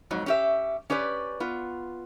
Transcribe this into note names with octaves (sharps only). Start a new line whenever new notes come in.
F2 G#2 F#3
C#4 G4 E5
C#4 G4 B4 D5
B3 F4